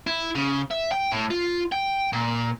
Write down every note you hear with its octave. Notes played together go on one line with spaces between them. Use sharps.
E4
C#3
E5
G5
A2
F4
G5
A#2